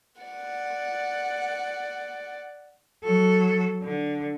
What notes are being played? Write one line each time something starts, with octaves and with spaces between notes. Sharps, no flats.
D5 F#5
F#3 A4
D3